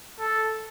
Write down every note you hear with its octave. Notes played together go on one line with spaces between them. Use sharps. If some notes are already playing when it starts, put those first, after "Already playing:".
A4